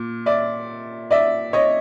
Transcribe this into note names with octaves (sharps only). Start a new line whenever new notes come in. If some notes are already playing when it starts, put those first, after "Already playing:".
Already playing: A#2
D5 E5
D5 E5
C#5 D#5